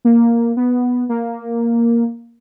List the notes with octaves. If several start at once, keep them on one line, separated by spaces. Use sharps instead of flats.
A#3
B3
A#3